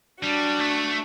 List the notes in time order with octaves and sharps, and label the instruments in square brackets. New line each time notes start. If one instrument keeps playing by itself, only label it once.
[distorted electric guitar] G3 [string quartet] D4 F#4
[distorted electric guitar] A3